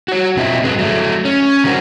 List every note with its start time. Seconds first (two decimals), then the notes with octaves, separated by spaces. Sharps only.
0.08 F#4 C#5
0.37 B2 C4 F4 D#5 E5
0.64 G2 F#4 G#4 B4
0.79 F#3 A3
1.25 C#4
1.64 D3 F#3 B3 F#4 A#4 C5